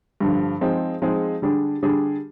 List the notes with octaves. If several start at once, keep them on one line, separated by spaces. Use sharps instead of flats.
G2 D3 F3
F3 G#3 C4 D#4 G#4
F3 G#3 C4 D#4 G#4
D3 G3 D4 G#4
D3 G3 D4 G#4